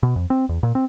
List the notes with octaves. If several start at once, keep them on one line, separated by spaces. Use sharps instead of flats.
B2
F2
C4
E2
A#2
C4